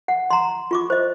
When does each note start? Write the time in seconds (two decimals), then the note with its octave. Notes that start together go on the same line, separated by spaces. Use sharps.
0.08 F#5
0.30 A#5 C6
0.71 F4 C#6 D6
0.90 C5 D#5